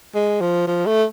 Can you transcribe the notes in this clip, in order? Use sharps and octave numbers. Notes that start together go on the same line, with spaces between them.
G#3
F3
F3
A3